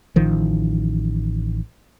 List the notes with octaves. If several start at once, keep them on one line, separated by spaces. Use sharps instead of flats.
A1 D#3 F3